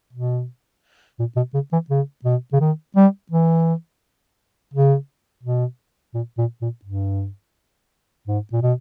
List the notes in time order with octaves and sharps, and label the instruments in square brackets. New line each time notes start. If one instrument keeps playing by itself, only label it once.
[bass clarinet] B2
A#2
B2
C#3
E3
C#3
B2
C#3
D#3
G3
E3
C#3
B2
A#2
A#2
A#2
G2
G#2
A#2
B2